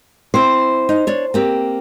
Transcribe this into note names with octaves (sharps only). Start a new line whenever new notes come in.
C4 E4 C5
D#4
D4 C#5
A#3 C4 G4